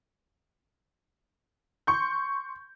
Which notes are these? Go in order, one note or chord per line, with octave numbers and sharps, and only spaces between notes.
C6 C#6 G6